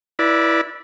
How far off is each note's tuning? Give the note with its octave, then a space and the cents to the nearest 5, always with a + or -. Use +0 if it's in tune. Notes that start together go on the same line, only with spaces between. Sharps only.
E4 +0 B4 -30 D5 +0